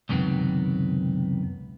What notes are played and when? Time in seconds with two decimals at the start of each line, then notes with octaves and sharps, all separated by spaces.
0.09 C#2 F#2 C3 D#3 B3